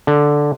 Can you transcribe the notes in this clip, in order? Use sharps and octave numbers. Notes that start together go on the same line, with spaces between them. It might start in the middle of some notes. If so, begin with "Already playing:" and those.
D3